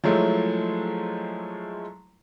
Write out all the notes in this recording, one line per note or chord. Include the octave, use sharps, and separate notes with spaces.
F3 F#3 G#3 A3 E4